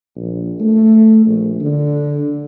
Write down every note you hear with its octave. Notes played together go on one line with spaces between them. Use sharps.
A#1
A3
A#1
D3